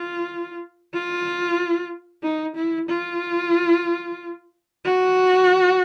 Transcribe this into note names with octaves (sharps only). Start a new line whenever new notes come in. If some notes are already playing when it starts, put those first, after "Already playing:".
Already playing: F4
F4
D#4
E4
F4
F#4